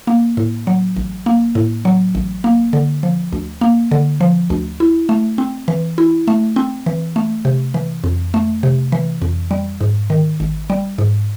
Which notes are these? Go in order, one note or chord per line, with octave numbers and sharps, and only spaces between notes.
A#3
A2
F#3
A1
A#3
A2
F#3
A1
A#3
D3
F3
D2
A#3
D3
F3
D2
E4
A3
C4
E3
E4
A3
C4
E3
A3
C3
E3
F2
A3
C3
E3
F2
G3
G#2
D#3
G#1
G3
G#2